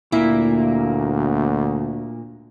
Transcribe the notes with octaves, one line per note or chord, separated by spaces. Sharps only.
D2 A#2 A#3 E4